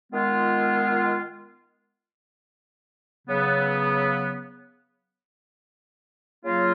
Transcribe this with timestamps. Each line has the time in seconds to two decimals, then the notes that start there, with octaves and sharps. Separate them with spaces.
0.11 D#3 G#3 B3 F4
3.27 C#3 F#3 B3
6.43 C#3 F#3 A#3 F4